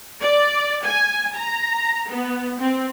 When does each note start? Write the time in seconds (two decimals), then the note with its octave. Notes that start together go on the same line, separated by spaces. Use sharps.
0.21 D5
0.85 G#5
1.35 A#5
2.09 B3
2.59 C4